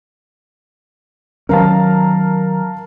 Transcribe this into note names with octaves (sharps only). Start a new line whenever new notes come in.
D#3 F#3 C#4 A#4 F5 A5